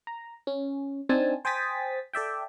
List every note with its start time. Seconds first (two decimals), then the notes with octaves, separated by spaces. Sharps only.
0.07 A#5
0.47 C#4
1.09 C4 D4 D#4 G#5 A5
1.45 C5 G5 G#5 D#6 A6 B6
2.13 A4 D5 E5 G5